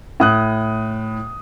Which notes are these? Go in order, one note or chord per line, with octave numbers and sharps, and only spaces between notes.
A2 D#6 F#6